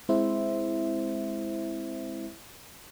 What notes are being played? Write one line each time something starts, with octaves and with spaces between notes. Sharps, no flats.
G#3 C4 E4 C5 E5